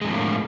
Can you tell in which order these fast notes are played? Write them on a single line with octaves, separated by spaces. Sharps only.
G#3 F2 D3 A2 A#3